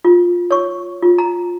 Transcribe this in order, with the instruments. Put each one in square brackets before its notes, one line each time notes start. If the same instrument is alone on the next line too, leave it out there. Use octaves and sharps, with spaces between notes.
[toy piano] F4
C#5 C#6
F4
A#5